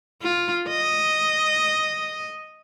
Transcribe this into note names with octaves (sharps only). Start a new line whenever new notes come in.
F4
D#5